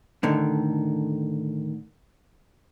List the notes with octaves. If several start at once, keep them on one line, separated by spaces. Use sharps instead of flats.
A2 D3 D#3